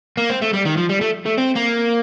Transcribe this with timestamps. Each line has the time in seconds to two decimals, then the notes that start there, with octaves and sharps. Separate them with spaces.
0.17 A#3
0.30 C4
0.42 A3
0.54 G3
0.66 D#3
0.78 F3
0.90 G3
1.01 A3
1.26 A3
1.38 C4
1.55 A#3